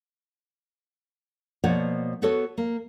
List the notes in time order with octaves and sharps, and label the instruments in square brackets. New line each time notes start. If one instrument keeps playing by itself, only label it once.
[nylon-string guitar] B2 F3 A#3 C#5 D5 F#5
B3 F#4 A4 B4 C#5
A#3